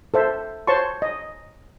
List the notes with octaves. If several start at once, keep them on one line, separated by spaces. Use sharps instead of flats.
A4 C5 E5
C5 C#5 A5 C6 C#6
D#5